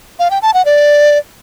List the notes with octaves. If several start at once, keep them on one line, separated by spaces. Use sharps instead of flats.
F5
G5
A5
F#5
D5